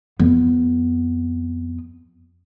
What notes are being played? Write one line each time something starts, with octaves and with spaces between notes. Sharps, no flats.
F2 B3